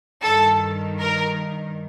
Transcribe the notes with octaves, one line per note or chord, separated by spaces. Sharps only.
G2 D#3 A4
A#4